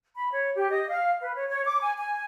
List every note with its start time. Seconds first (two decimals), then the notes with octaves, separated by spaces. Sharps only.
0.15 B5
0.31 C#5
0.55 G4
0.70 D#5
0.89 F5
1.20 B4
1.35 C#5
1.49 C#5
1.65 D6
1.81 G#5
1.97 G#5